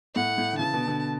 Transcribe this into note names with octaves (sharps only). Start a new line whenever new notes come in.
A2 F#5
A2
D3
C#3 E3 A5
B2 D3
B2 D3